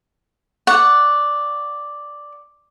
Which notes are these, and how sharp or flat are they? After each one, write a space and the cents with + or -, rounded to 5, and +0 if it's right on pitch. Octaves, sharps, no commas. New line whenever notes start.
D5 +0 F#5 +0 C#6 +10